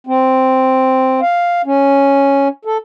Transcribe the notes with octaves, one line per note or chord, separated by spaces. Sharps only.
C4
F5
C#4
A4